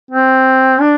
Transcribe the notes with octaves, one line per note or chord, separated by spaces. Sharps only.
C4
D4